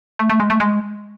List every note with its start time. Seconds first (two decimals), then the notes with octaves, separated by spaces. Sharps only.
0.19 A3
0.30 A3
0.40 G#3
0.50 A3
0.60 G#3